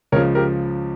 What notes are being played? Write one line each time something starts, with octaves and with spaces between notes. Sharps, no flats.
C#2 C#3 F3 A#4 C#5
G4 A#4